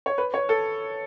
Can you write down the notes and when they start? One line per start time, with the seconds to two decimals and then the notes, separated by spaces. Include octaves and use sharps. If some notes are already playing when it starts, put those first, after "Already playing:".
0.06 C#5
0.18 B4
0.34 C#5
0.49 A4